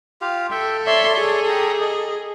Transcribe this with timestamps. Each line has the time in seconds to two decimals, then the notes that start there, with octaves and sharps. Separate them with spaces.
0.21 F4 G4 F5
0.51 A4 E5 G5
0.87 C#5 D5 E5 C6
1.17 G#4
1.49 G4 A#5 D#6
1.81 D#5